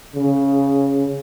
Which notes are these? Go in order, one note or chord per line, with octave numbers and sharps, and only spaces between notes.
C#3